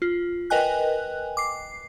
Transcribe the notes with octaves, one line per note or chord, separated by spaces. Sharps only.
F4
A#4 B4 D#5 G5 G#5 F#6
D6 C7